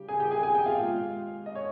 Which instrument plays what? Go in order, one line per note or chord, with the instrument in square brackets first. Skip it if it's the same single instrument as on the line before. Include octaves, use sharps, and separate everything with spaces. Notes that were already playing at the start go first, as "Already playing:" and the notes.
Already playing: [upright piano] C#3 G3 G4
G#4 G#5
G4 G5
G#4 G#5
G#4 G#5
G4 G5
F4 F5
A#2 G#3
D#5
C#5